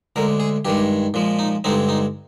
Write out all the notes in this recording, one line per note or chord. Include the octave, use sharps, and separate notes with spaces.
D2 D3 G#3 A#4
G#4
G2 D#3 G#3 G4
A#2 F3 G#3
D#4
G2 D3 G#3 C4 D#4
D#4